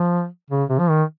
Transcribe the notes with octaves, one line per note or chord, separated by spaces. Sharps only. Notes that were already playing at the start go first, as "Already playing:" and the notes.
Already playing: F3
C#3
C3
F3
D#3